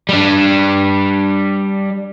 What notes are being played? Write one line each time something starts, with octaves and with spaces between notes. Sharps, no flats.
G3 D4